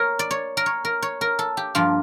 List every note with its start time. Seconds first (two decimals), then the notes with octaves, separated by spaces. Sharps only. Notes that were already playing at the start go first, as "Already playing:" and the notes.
Already playing: A#4 C#5
0.19 D5
0.31 C#5
0.57 A#4
0.66 C#5
0.85 A#4
1.02 C#5
1.21 A#4
1.39 A4
1.57 G4
1.75 G2 F3 A#3 F4